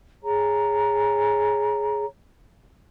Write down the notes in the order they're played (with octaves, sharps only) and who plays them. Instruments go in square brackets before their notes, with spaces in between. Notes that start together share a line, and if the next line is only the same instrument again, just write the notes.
[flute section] G#4 C#5 A#5